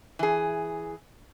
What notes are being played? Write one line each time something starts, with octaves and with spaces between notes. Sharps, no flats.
E3 G#4